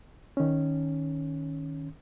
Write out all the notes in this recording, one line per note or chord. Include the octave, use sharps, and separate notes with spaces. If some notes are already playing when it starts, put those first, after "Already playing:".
D#3 C#4